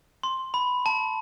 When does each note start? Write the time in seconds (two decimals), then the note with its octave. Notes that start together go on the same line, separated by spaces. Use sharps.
0.23 C6
0.54 B5
0.86 A5